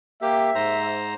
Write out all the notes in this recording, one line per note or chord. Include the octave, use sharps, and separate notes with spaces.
A#3 G4 E5
G#2 C5 A#5